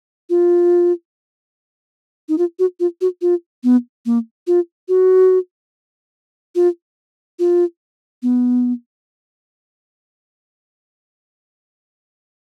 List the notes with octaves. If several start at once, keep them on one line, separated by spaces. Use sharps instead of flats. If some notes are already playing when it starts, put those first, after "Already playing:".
F4
D#4
F4
F#4
F4
F#4
F4
B3
A#3
F4
F#4
F4
F4
B3